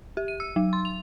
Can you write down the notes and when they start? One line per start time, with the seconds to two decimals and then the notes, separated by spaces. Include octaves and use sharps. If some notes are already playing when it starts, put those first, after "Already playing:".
0.17 G4
0.28 D#7
0.40 E6
0.56 F#3
0.73 C6
0.85 F7